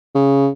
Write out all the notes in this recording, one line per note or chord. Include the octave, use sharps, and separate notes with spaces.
C#3